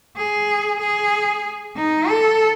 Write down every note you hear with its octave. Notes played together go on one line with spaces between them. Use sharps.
G#4
G#4
D#4
A4